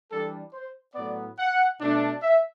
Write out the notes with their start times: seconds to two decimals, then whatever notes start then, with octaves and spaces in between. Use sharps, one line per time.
0.10 E3 G3 D4 A4
0.53 C5
0.95 A2 F#3 B3 D5
1.38 F#5
1.80 B2 A3 D4
2.22 E5